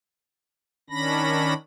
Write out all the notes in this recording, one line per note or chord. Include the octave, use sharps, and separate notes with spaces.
D#3 C#4 D4 B5 A#6